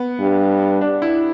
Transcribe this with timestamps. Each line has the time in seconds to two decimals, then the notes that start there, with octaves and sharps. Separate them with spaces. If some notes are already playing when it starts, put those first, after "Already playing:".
Already playing: B3
0.20 G2
0.81 D4
1.02 E4